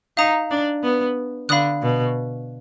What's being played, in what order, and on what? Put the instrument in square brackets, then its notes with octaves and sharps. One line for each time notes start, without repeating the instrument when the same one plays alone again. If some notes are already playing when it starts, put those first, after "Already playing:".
[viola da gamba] D#4 [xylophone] F5 A#5 D#6
[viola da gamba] D4
B3
[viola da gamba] D3 [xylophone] F5 B5 D#6 F#6
[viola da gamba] B2